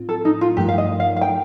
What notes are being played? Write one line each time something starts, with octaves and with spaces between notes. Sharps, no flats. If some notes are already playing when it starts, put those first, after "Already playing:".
Already playing: A2 C4 F4
A4
D#4
F4
G2 F3 A3 D#4 G4 A#4
F5
D#5
F5
F5
G5